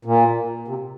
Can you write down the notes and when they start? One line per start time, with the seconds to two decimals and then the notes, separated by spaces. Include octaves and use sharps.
0.05 A#2
0.68 C3